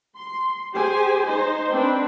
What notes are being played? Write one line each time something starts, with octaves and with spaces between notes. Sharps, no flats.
C6
G4 G#4 C5 G#5
D#4 C5
C4 D4 B4